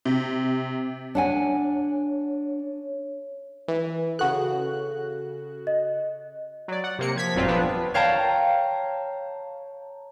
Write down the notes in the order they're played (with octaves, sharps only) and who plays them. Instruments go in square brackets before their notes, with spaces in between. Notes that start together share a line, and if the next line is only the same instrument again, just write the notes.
[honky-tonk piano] C3
[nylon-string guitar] D4 F#5 G#5 [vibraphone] C#5
[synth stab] E3
[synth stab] C#3 F#4 F#6 [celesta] A4
[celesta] D#5
[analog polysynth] F#3 D5
F#5
C3 A#3 C#7
F3 G#6 B6
G1 F2 A#2 F#3 C4 F4
F3 B3 D4 B4
[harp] C#5 F5 G5 A5 A#5